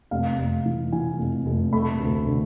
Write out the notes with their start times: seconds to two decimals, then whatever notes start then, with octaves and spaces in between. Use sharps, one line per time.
0.11 F1 F5
0.38 F1
0.66 E3
0.92 E3 G#5
1.19 F1
1.46 F1
1.72 A3 B5
2.00 D2
2.26 D3